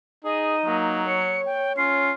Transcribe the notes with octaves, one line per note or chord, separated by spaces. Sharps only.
D#4 G#4 D#5
F#3 A#3
C#5 C#7
G5
C#4 F4 C7